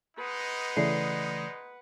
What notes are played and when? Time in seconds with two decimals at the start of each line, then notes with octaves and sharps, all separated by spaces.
0.18 G#3 D#4 B4 F#5
0.77 C#3 E3 A3 D5 C7